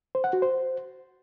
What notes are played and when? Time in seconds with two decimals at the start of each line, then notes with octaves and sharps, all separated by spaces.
0.15 C5
0.24 F#5
0.33 F#4
0.42 C5